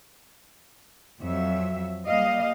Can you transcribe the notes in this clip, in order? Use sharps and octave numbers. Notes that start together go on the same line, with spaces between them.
F2 F#3 E5
G3 A#3 D#5 F5